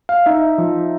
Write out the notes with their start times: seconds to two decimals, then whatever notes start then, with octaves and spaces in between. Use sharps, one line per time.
0.09 F5
0.26 D#4 E5
0.58 F3